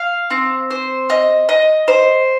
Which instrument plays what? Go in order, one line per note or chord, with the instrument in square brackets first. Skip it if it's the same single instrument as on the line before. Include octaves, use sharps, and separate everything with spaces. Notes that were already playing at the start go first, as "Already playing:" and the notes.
Already playing: [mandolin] F5
C4
C5
D#5
D#5
C5